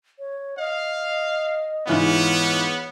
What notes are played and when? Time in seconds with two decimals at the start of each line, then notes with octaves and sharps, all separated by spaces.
0.19 C#5
0.58 D#5 F5
1.87 G#2 E3 B3 F4 C#5